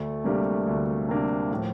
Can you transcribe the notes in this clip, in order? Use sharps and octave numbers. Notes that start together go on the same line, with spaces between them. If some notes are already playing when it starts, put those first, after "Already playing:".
Already playing: D2 A3
C3 G3 A#3 D4
D2
C3 G3 A#3 D4
A2 F3